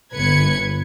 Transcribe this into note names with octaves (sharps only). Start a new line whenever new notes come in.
G1 B4 G#6 C#7